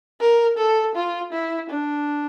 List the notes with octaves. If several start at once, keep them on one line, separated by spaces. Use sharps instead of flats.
A#4
A4
F4
E4
D4